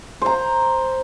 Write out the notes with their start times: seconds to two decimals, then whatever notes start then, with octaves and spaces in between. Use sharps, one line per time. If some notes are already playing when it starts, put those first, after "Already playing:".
0.21 C5 A#5